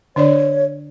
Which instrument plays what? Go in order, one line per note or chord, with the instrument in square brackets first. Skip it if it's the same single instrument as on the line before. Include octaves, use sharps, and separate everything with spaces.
[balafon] D3 D4 D5 [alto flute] C#5